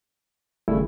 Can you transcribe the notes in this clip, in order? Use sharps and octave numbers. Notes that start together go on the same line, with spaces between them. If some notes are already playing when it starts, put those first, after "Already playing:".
G#1 C#3 G3 A3 E4